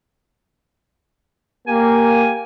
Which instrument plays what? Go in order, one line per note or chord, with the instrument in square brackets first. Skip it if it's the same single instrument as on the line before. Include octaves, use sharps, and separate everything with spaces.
[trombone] A#3 [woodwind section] G4 G#5